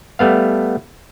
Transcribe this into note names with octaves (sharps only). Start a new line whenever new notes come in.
G3 A3 B3 F5